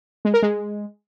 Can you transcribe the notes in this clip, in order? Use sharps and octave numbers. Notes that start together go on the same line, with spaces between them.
G#3
A#4
G#3